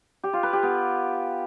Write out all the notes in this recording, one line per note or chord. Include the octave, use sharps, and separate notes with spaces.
G4
F4
B4
G4
B3